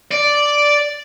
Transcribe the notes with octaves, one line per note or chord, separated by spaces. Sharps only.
D5